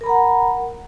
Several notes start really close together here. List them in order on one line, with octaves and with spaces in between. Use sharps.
A#4 B5 A#5 F#5